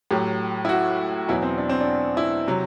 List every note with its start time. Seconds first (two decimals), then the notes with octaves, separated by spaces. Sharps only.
0.11 A2 F#3 G4
0.65 E4
0.69 F#4
1.28 E2 B2 F#3 E4
1.43 C4
1.58 D4
1.69 C4
1.81 D4
2.17 E4
2.48 C3 F#3